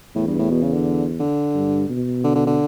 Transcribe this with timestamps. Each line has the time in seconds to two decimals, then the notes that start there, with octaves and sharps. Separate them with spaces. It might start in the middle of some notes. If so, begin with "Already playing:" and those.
0.15 E2 A2
0.27 G2
0.39 A2
0.51 B2
0.62 C#3
0.74 D3
1.20 D3
1.55 G2
1.89 B2
2.24 D3
2.35 D3
2.47 D3